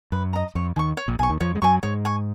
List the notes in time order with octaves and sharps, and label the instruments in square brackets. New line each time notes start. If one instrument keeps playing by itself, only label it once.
[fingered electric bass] F#2 [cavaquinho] B4
[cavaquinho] D#5 A#5
[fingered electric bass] F2 [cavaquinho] C#5
[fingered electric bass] D#2 D#3 [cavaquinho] G#5 C#6
[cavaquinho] C#5
[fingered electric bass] A#1 A#2
[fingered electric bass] B1 B2 [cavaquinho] G#5
[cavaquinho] C#6
[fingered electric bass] D#2 D#3
[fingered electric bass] F2 F3 [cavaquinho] C#5
[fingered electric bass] G#3
[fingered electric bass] F#2 F#3 [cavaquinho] G#5 C#6
[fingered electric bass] G#2 G#3 [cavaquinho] C#5
[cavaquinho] G#5 C#6